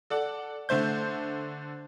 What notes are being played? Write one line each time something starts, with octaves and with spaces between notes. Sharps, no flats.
A4 D5 F#5
D3 A3 C5 G6